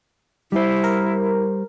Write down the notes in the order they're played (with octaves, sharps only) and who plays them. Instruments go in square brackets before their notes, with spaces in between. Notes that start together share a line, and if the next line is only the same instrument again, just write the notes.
[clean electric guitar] G3 C5 [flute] E4
[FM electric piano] A#4